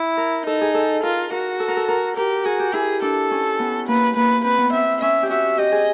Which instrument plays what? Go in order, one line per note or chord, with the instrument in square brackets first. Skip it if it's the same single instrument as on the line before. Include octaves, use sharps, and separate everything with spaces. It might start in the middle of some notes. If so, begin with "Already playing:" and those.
Already playing: [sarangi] E4
[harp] A#4
[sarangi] D#4 [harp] A4
[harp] G#4
A4
[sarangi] F4 [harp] A#4
[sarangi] F#4 [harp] A#4
[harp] A4
A#4
A4
A#4
[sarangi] G4 [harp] A#4
[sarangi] F#4 [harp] G#4
[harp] G4
[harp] E4 [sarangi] G#4
[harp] D4 [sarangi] A4
[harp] C#4
B3
[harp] A#3 [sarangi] B4
[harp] A#3 [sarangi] B4
[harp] C4 [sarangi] B4
[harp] B3
[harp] C4 [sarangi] E5
[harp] C#4 [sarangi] E5
[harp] G4
[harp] F#4 [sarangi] E5
[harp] G4 [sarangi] D#5
[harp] G#4